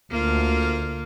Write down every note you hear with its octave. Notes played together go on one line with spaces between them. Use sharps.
D2 A#3 F4